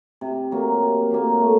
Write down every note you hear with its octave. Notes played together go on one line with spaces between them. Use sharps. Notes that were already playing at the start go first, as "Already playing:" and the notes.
C3
F#3 A#3
C3
F#3 A#3
A3